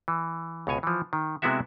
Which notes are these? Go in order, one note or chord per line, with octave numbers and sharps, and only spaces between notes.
E3
C#2 B2 C#5 G#5
E3 F3
D#3
C3 G#3 B3 E4 F#4 E5